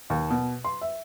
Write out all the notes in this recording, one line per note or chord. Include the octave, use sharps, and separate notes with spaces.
D#2
B2
C6
E5